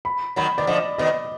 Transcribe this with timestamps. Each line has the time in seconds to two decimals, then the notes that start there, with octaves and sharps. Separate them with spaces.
0.05 B5
0.36 D#3 F#3 B5
0.58 D#3 D5
0.67 D3 F3 D#5
0.98 B2 D#3 D#5